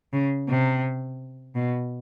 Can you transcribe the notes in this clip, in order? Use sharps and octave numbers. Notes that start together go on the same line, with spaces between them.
C#3
C3
B2